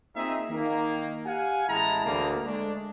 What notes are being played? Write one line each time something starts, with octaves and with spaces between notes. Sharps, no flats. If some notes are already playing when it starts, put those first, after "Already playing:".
A#3 C4 D#4 F4 G#4 E5
D#3 A#3
G4 F5 F#5 G#5
A1 G#3 E4 A5 A#5
D2 A#3
G#3 A3 D4